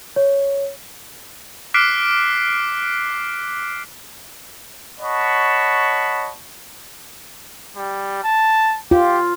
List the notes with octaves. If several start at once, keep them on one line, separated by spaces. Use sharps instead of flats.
C#5
D6 F6 F#6 B6 C7 D7
C#5 D#5 F#5 A5 B5 C#6
G3
A5
F4 G4